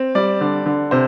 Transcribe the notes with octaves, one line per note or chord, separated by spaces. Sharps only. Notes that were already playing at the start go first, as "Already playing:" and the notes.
Already playing: C4
G3 D5
D3
D3
C3 C5